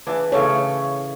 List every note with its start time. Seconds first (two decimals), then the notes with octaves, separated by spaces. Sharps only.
0.07 E3 D4 G#4
0.32 A2 C#3 A3 C#5